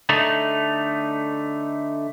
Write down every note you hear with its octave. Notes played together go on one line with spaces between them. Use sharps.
D3 A3 D#4